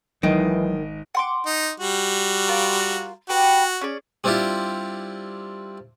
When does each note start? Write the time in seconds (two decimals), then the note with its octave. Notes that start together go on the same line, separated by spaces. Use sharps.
0.23 G#1 D#3 E3 F#3 G#3 D#5 D7
1.15 F#5 C6 D6
1.46 D#4
1.80 G3 F#4
2.48 F4 A#4
3.29 F#4 G4 B4 F#5
3.81 C#4 G#4 D5
4.24 G3 C4 D4 E4 F4 G4